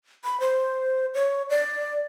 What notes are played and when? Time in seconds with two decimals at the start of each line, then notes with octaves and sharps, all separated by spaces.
0.24 B5
0.40 C5
1.15 C#5
1.50 D5